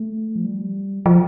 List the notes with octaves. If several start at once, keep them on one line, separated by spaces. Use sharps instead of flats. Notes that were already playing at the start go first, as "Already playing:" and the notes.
Already playing: A3
F3
G3
F3